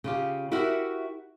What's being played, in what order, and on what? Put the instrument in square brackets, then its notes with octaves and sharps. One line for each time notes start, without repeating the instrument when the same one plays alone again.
[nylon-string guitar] C#3 F4 G4
E4 F#4 G4 A#4 E5 F#5